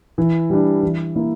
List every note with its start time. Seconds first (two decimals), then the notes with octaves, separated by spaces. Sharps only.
0.18 E3
0.50 G3 D4
0.83 E3
1.16 A#3 E4